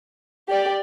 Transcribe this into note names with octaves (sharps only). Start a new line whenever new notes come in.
G4 D5 G5